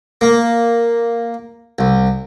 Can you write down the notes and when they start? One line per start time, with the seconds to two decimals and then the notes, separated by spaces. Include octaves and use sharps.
0.21 A#3
1.79 C2